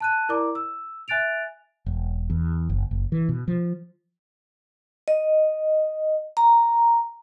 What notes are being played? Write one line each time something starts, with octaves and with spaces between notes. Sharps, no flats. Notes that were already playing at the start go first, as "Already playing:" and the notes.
A5 F#6 D#7
E4 A#4 D5 A#5 D6
E6
E5 G#5 F#6 A6 D7 F7
E1
E2
F#1
F#1
E3
B2
F3
D#5
A#5